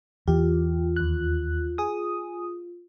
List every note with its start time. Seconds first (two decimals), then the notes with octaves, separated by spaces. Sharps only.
0.28 E2 E3 F4 G4
0.96 D#2 F#6
1.78 G#4 D#6